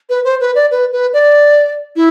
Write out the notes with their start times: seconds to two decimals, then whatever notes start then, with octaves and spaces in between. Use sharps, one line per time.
0.09 B4
0.24 C5
0.40 B4
0.55 D5
0.70 B4
0.92 B4
1.13 D5
1.95 E4